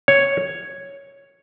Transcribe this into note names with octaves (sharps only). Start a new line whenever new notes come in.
C#5